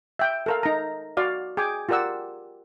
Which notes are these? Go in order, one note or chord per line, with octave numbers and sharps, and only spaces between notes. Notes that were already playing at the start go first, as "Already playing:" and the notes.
E5 G5
A4 A#4 F5
D#4 A#5
F#4 D5 F5
G#4 G5 G#5 D6
F4 G4 A#4 D5 F#5 E6